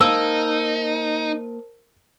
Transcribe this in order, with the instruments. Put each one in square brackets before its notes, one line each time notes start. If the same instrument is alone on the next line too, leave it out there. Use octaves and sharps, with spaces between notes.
[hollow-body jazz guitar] A#3 [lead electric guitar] D#4 [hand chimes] A#4 C5 A5 [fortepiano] E6